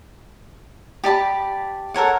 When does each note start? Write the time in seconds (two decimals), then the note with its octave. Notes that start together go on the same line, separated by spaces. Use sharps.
1.04 G4 D5 A5 B5
1.94 A4 A#4 C#5 F#5